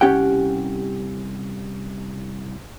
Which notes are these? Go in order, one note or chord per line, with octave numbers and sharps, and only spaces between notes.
C2 C#4 G4 F#5 G5